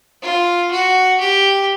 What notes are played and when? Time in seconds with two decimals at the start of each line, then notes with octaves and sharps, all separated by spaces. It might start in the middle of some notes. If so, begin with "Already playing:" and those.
0.22 F4
0.71 F#4
1.20 G4